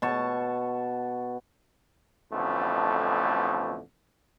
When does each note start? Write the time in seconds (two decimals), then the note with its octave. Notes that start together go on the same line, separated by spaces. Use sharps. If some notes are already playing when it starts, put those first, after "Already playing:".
0.02 B2 A5 C#6
2.32 A1 F2 B2 D3 A3